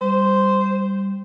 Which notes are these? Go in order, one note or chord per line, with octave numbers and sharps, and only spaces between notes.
G3 C5